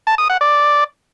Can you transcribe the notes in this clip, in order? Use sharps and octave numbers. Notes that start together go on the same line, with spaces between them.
A5
D#6
F#5
D5